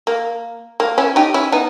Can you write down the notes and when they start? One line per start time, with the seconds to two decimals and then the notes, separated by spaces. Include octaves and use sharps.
0.07 A#3
0.80 A#3
0.98 C#4 E4
1.16 D#4 G4
1.34 C#4 E4
1.52 B3 D#4